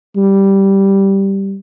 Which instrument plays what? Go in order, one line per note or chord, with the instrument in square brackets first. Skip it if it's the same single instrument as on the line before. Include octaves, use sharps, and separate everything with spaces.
[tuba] G3